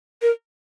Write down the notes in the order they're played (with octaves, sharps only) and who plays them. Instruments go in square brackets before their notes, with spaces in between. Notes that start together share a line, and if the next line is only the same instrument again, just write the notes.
[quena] A#4